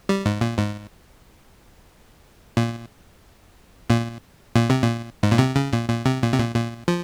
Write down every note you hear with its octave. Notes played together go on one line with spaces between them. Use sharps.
G3
G#2
A#2
G#2
A#2
A#2
A#2
C3
A#2
G#2
A#2
C3
C#3
A#2
A#2
C3
A#2
C3
A#2
A#2
F3